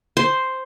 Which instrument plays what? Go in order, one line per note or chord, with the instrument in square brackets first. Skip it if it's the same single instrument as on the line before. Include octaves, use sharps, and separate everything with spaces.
[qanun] C5